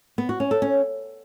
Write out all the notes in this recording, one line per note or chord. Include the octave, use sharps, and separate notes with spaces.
B3
F#4
C#4
A4
C#4